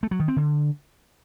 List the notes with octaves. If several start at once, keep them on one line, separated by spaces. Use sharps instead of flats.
A3
F#3
D#3
C4
D3